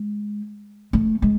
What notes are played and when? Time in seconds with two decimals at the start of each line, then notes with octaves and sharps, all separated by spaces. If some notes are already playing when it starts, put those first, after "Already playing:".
Already playing: G#3
0.93 A3
1.22 G#3